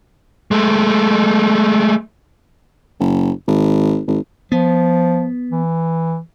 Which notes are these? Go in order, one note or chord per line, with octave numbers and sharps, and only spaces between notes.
G#3 A3
F#1
G#1
G#1
F3 B3
E3